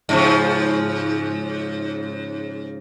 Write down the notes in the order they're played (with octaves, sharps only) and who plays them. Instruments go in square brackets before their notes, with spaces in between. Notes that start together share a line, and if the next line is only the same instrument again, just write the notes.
[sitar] G#2 C#3 F3